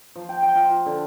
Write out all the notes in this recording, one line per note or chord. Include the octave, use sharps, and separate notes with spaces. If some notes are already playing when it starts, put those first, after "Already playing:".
F3
G5
G5
F4
F4
D3